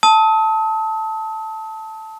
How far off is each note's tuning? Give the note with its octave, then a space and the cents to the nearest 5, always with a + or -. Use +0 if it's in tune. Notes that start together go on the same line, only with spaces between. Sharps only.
A5 +0 D#6 +45